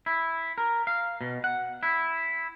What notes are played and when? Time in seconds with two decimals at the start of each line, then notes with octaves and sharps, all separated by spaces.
0.06 E4
0.58 A#4
0.87 F5
1.21 B2
1.44 F#5
1.83 E4